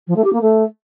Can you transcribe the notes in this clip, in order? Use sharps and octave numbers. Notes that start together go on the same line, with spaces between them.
F3
A3
G4
A#3
A3